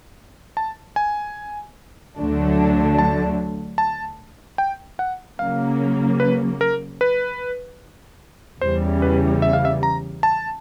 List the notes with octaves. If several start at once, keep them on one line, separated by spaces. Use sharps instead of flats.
A5
G#5
D2 D3 F#3 A3 D4
A5
A5
G5
F#5
C#3 F#3 A#3 F5
B4
A#4
B4
E2 C#3 E3 G3 C5
B4
E5
F5
E5
A#5
A5